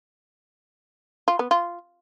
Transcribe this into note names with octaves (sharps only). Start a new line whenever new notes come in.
F4
B3
F4